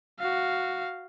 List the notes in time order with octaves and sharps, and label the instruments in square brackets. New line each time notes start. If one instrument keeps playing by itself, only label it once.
[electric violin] F#4 F5